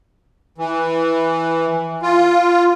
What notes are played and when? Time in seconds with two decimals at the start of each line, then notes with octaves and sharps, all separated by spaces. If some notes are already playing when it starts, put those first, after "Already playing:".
0.58 E3
2.02 F4